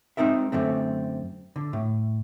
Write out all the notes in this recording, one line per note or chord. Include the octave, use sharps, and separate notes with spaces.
G#3 C4 D#4 A#4 E5
F#2 D3 A3 C4
D3
A2